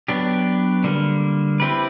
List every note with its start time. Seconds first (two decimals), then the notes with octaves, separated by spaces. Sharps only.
0.08 F#3 B3 D4 G4
0.84 D3 G3 A#3
1.60 C4 E4 G4 B4